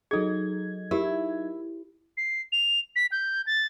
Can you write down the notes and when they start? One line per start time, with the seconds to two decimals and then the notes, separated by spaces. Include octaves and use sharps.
0.11 F#3 D#4 G#4 A4 G#6
0.91 E4 G4 A#4
2.17 C7
2.52 F7
2.96 B6
3.12 G6
3.47 A6